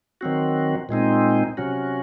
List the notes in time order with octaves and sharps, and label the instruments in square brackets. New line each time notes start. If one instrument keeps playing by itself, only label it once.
[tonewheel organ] D#3 F#3 C4 F#4
A#2 G#3 C4 D#4
C3 F#3 C#4 F#4